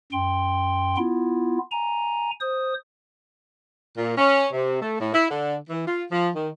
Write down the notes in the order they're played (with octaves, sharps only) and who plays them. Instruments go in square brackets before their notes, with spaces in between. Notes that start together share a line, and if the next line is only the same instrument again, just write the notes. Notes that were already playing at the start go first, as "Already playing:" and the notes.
[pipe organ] F#2 G5 C6
B3 E4 F4
G#5 A#5
C5 D#6
[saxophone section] A#2
C#4
C3
A3
A2
E4
D3
E3
F4
F3
D#3